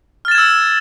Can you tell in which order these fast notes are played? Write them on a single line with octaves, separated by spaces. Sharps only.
F6 A6 E7 G#6 E6